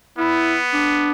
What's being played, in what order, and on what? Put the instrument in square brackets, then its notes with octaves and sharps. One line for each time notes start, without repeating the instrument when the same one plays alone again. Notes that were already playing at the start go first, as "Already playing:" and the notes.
[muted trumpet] B3 [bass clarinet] E4
[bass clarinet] D4